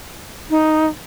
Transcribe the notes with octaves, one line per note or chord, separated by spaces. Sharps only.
D#4